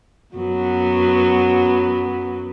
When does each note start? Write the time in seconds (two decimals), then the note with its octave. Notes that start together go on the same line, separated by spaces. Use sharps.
0.35 F#2 F#3 B3